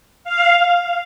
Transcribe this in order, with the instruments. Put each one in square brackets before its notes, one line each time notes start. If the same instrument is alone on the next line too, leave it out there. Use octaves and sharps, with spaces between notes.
[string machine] F5